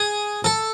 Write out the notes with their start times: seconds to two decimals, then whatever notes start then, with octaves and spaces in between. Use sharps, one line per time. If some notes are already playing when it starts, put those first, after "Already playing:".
Already playing: G#4
0.44 A4